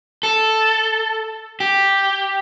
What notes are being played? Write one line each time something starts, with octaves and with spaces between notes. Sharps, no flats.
A4
G4